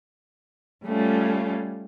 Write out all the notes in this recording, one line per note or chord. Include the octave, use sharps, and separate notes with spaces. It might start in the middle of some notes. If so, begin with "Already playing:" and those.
G3 A3 C#4 F4